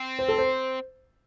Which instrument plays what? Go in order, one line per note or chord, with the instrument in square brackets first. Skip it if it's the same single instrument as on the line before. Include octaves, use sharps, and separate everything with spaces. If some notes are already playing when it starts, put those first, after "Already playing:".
Already playing: [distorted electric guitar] C4
[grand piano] C5
A4
C5